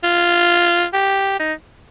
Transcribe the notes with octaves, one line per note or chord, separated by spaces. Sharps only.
F4
G4
D#4